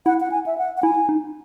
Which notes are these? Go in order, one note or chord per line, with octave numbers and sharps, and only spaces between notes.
E4 F#5
F#5
G#5
E5
F#5
F#5
E4 G#5
D#4